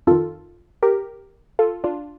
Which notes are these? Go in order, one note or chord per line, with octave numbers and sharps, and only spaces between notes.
F2 D#3 F4 A4
G4 A#4
F4 A4
D4 F4